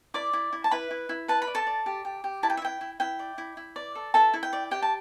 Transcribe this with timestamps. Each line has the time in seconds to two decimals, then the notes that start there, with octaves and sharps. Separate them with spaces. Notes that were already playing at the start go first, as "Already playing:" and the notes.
0.14 E4 D5 D6
0.33 E4
0.53 E4
0.64 A5
0.71 E4 B4 B5
0.91 E4
1.09 E4
1.28 B4 A5
1.42 B5
1.47 D5
1.55 A4 A5
1.67 D5
1.86 G4
2.05 G4
2.24 G4
2.43 E4 A5
2.50 G5
2.57 E5
2.62 E4 G5
2.81 E4
3.00 E4 G5
3.19 D5
3.38 E4
3.57 E4
3.76 D5
3.95 A4
4.14 E4 A4 A5
4.34 E4
4.43 G5
4.53 D5
4.71 G4 G5
4.83 A5